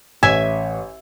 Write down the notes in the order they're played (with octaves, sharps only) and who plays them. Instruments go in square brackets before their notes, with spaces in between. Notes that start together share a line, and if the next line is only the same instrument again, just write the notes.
[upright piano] A1 C#5 [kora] E5 [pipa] G#5